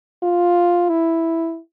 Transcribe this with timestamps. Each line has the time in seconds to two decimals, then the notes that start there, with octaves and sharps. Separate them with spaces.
0.23 F4
0.89 E4